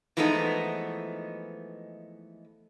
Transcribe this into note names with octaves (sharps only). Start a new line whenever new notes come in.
E3 F3 G#3 A3 B3 D#4